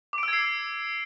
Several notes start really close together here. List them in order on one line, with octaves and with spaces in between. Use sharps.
D6 D7 E6 G#6 C7